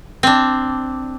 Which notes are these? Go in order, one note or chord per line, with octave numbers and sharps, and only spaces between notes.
C4 D4